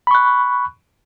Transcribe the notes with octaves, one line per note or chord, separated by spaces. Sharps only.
B5 C#6 F#6